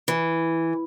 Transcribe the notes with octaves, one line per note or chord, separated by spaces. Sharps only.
E3